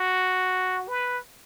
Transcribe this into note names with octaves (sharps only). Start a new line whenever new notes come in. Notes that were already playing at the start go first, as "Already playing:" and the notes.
Already playing: F#4
B4